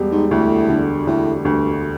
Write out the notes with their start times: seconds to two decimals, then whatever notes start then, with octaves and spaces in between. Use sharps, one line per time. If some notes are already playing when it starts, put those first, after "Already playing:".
Already playing: E1 G3
0.12 G#2
0.31 D2 A2
0.69 D3
1.07 D2 A2
1.45 D2 G2